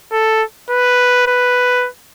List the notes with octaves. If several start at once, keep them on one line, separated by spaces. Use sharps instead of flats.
A4
B4
B4